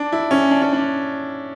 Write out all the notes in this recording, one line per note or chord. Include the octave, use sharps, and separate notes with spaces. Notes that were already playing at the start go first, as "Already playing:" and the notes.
Already playing: D4
E4
C#4
D4
C#4
D4